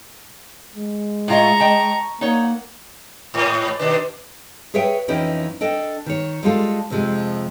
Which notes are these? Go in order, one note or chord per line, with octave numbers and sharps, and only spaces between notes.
G#3
A2 F4 D#5 A#5 C#6
D#5 G5 A5
A#3 D#4 C#5 F#5
G#2
B2 D#3 D4 B4
G#4 B4 C#5 E5 G5
F2 E3 C#4 D#4 E4 G5
D4 A4 D#5 G5
D#3 C#5
G3 G#3 F4 A4
F2 C3 F3 G#3